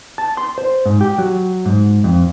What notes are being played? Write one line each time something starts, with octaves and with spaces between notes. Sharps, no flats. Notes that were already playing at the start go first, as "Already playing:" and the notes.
A5
C6
C5
G#2
G4
F#3
G#2
F2